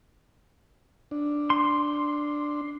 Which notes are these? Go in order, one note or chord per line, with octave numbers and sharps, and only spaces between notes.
D4
C6